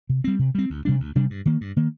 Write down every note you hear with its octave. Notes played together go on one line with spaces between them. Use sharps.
C3
G3 C4
C3
G3 C4
D2
C3 G3 D4
D2
C3 G3 D4
G2
D#3 A#3
G2
D#3 A#3